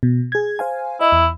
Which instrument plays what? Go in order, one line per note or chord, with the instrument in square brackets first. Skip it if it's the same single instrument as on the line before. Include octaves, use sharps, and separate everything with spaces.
[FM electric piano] B2
G#4 G#6
C5 F5 G#5
[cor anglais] E4 [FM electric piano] D#5
[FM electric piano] E2